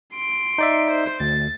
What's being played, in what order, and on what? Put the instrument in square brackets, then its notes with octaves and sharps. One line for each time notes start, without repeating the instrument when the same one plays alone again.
[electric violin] C6 D7
[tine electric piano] D#4 D5 E5
[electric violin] C5
[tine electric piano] D2 [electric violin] A6